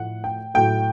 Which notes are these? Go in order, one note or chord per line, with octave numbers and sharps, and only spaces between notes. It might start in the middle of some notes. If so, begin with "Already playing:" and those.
Already playing: A2 F3 A3 F#5
G5
A2 F#3 A3 G5